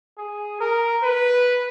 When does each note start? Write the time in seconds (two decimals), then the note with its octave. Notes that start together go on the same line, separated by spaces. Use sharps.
0.18 G#4
0.60 A#4
1.03 B4